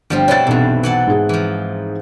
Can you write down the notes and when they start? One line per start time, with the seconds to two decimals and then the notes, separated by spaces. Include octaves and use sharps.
0.10 G1 F3 G3 C4
0.28 B2 C4 E4 C#5 D5 A6
0.47 B1 E2 G2 C3
0.83 E3 F#5 A5
1.07 G#2 G#4
1.29 E3 F3